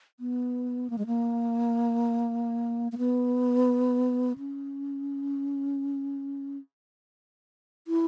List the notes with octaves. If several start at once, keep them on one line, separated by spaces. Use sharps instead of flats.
B3
A#3
G#3
A#3
A#3
B3
C#4
E4